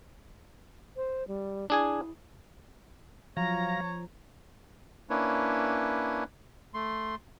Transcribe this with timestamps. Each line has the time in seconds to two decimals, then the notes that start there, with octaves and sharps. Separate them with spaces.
0.96 C5
1.28 G3
1.70 D4 E4 G#4 G#5
3.37 F3 F#3 C#5 F5 A#5 A#6
5.10 A#3 C#4 D4 E4 B4 C#5
6.74 A3 C6